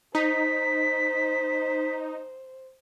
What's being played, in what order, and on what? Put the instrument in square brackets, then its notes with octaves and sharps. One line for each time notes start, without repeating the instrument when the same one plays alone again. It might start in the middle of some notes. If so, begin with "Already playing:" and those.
[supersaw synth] D#4 [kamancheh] C5 [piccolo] B6